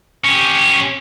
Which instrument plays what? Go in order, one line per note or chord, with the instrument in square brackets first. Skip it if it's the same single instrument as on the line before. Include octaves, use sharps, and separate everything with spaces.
[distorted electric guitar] C#4 G4